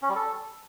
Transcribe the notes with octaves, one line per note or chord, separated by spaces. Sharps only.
C#4
G3
A4